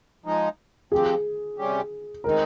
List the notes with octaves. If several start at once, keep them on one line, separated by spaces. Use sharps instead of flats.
F3 G#3 D#4
F3 C4 G4 G#4
C3 G3 C#4 G4
D#3 G#3 C4 D#4 A#4